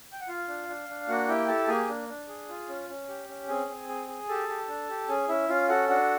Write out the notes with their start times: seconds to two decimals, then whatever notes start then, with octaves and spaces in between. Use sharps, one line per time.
0.12 G5
0.21 F#5
0.28 F4 F5
0.48 D4
0.69 D4
0.89 D4
1.08 A#3 F#4 F#5
1.28 E4 G4 G5
1.48 G4 A4 A5
1.68 A#3 G#4 G#5
1.89 D4
2.09 D4
2.28 G#4
2.49 F4
2.69 C#4
2.89 C#4
3.09 G4
3.28 C#4
3.49 C4 G#4 G#5
3.69 C4
3.89 G#4
4.08 G#4
4.29 G4 A4 A5
4.49 G4
4.68 D4
4.89 G4
5.08 C#4 G#4 G#5
5.29 C#4 E4 E5
5.49 C#4 F4 F5
5.69 F#4 A4 F#5
5.89 D4 F#4 F#5